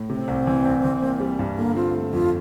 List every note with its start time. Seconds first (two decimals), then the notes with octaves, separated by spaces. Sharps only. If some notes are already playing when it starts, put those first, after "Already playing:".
Already playing: A2
0.09 C3 C4
0.28 C2
0.47 E3
0.65 C2
0.84 E3
1.02 A#3
1.20 G3
1.39 G2
1.57 D3 A#3
1.76 C4 F4
1.95 A3
2.13 F2 F4